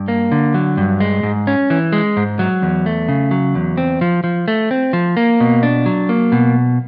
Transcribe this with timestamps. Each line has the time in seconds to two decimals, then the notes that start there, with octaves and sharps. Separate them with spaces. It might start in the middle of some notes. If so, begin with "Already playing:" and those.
Already playing: G2
0.08 A#3
0.32 D3
0.54 F#3
0.77 G2
1.00 G#3
1.23 G#2
1.47 C#4
1.70 E3
1.92 G#3
2.17 G#2
2.39 F#3
2.62 E2
2.86 A3
3.08 C#3
3.31 F#3
3.55 E2
3.78 C4
4.01 F3
4.24 F3
4.48 A3
4.71 C4
4.93 F3
5.17 A#3
5.40 B2
5.63 D4
5.86 F#3
6.09 A#3
6.32 B2